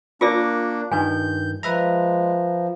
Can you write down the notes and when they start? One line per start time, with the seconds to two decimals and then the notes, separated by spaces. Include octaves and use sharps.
0.21 A#3 D4 F4 A#4 D5 C#6 D6 A#6
0.92 G2 D#3 G#5 G6
1.63 F3 G#3 B4 E5 A#5